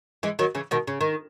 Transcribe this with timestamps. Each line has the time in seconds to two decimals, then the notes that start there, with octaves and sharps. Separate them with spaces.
0.23 E3 G#3
0.39 D#3 F#3
0.55 C#3 E3
0.71 B2 D#3
0.87 C#3
1.01 D#3